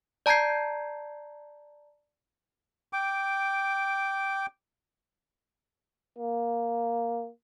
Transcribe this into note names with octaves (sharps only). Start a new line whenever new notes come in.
D5 A5 A#5 G6 G#6 C7
G5 D6
A#3